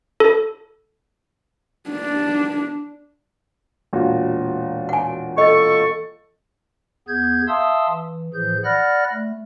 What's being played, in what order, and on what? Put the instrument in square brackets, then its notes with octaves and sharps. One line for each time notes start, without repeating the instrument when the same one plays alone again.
[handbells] A4
[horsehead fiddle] D4
[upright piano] E1 A#2 F#4
[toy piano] F#5 G#5
[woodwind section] A4 C#6 [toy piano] D#5
[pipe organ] E2 B3 G#4 G6 G#6
E5 F5 A5 C6 D#6 E6
E3
A2 E3 F3 G#4 G6
D5 F#5 B5 F6 F#6 A#6
A3